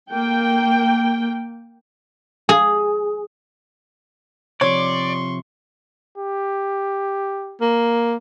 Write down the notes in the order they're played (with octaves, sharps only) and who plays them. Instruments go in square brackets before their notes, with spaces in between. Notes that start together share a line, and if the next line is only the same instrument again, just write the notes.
[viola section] A#3 G5
[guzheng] G#4
[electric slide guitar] C3 F3 [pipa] C#5 [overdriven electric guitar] D5 [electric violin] C6 C#6
[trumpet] G4
[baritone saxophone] A#3